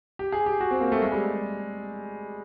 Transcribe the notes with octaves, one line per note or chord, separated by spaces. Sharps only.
G4
G#4
G4
F#4
C4
A#3
A3
G#3
G3